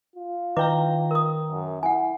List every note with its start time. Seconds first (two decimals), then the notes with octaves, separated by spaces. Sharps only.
0.16 F4
0.57 D#3 E4 B4 G5 A#5 D6
1.11 A#4 D#6
1.51 F#2
1.83 E4 F#5 G#5